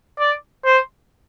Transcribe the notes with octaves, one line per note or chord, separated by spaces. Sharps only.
D5
C5